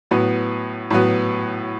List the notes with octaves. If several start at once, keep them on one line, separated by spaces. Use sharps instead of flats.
A2 F#3 B3
A2 F#3 B3